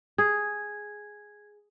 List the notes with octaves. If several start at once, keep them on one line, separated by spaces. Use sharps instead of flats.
G#4 G#6